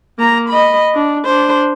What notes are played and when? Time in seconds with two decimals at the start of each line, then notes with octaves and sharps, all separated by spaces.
0.19 A#3 A#5
0.49 D#5 B5
0.95 D4
1.25 D4 C5